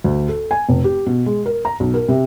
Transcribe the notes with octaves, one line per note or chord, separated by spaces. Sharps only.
D2
A4
G#5
F1
G4
B2
G#3
A#4
A#5
B1
A#4
C3